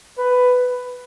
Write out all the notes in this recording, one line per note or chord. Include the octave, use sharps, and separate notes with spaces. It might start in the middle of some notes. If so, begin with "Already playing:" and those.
B4